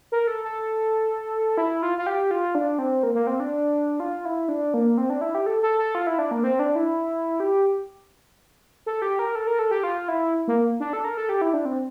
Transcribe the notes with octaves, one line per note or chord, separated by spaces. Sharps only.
A#4
A4
A4
E4
F4
F4
G4
F4
D4
C4
A#3
A#3
C4
D4
F4
E4
D4
A#3
C4
D4
E4
G4
A4
A4
A4
F4
E4
D4
A#3
C4
D4
E4
G4
A4
G4
A#4
A4
A#4
A4
G4
F4
E4
A#3
D4
A4
A#4
A4
G4
E4
D4
C4